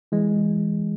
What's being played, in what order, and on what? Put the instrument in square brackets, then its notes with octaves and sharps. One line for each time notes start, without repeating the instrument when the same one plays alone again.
[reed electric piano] E3 [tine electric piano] G#3